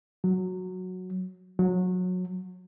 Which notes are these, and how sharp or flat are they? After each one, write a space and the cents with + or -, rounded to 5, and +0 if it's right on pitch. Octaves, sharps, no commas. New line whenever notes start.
F#3 -10
F#3 -25